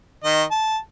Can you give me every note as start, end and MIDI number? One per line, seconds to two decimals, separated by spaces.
0.24 0.43 51
0.24 0.43 75
0.51 0.77 81